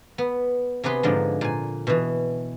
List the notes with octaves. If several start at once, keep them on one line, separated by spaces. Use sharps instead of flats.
B3
C3 B3 G#4 B4 C6
G#2 D3 F3 G#3
A#2 G#5
B2 E3